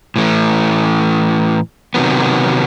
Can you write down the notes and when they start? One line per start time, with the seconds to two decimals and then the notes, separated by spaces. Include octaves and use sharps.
0.16 A2 E3 A3
1.94 C3 D#3 F#3 B3